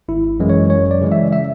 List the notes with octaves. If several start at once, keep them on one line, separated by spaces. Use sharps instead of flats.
G#1 E4
F#2 E3 G#3
C#5
F#2 C#5
D5
C#3 E3 G#3
E5
E5